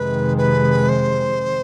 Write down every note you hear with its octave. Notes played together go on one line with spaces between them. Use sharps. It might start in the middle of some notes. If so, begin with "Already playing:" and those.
Already playing: F2 C3 D#3 G#3 B4
B4
C5